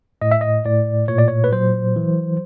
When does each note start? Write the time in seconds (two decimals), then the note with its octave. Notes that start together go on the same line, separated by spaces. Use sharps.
0.22 A2 D#5
0.31 E5
0.41 D#5
0.65 A2 D5
1.08 A#2 C#5
1.18 D5
1.28 C#5
1.44 B4
1.52 F#3 C5
1.96 E3